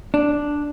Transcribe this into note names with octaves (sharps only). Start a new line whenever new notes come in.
D4